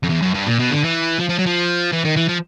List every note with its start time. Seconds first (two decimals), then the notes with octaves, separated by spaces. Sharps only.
0.04 F2
0.10 E2
0.22 F#2
0.34 G2
0.47 A#2
0.59 B2
0.71 D3
0.84 E3
1.19 F3
1.29 F3
1.38 F#3
1.46 F3
1.92 E3
2.05 D#3
2.16 E3
2.28 F3